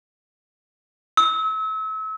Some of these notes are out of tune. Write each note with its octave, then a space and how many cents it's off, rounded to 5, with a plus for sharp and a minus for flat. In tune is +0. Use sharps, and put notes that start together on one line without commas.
E6 -35